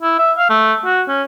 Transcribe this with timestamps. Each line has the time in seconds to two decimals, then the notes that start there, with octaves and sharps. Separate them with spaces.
0.02 E4
0.19 E5
0.38 F5
0.50 A3
0.85 F#4
1.08 C#4